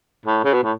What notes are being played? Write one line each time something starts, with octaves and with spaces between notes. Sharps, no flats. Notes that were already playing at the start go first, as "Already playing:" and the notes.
A2
C#3
B2
A2